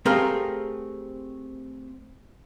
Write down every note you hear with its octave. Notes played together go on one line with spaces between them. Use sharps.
A3 C4 G4 G#4 A#4 F5